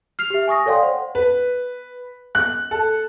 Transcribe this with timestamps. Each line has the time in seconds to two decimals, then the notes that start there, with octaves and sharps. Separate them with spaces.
0.19 F6 C7 F7
0.30 G4 E5
0.48 G#5 C#6 D#6 A#6
0.66 A4 C#5 D5 F5 G5 C6
0.83 C5 F#5
1.15 B4
2.35 F#6
2.71 A4